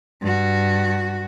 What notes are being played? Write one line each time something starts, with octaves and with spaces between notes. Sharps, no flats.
G2 F#4